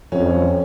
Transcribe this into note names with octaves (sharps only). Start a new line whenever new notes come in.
F2 C#4